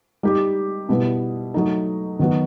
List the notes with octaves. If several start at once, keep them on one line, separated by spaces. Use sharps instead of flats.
G3 D#4 G4
B2 G3 B3 E4
F#3 A3 D#4
D#3 F#3 B3 F#4